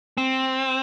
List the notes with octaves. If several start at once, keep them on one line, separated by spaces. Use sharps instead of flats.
C4